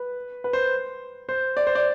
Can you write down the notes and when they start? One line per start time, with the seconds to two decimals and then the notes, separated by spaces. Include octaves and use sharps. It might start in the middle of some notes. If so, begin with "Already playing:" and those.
Already playing: B4
0.44 B4
0.53 C5
1.29 C5
1.57 D5
1.67 C5
1.75 D5